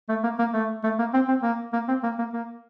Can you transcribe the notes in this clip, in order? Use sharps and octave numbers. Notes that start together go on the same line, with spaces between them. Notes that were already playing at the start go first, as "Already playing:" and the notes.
A3
A#3
A#3
A3
A3
A#3
C4
C4
A#3
A#3
C4
A#3
A#3
A#3